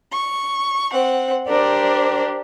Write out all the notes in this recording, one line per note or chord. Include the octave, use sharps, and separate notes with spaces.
C#6
C4 F#5
D4 G4 A#4 C5 D5